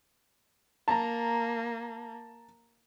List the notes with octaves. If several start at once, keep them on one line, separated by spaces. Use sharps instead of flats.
A#3 A5 A#5